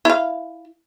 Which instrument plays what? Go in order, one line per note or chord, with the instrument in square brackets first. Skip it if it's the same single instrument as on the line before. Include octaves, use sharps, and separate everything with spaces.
[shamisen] E4 F5